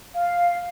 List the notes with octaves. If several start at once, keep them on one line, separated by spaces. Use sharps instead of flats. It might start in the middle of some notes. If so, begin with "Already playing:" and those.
F5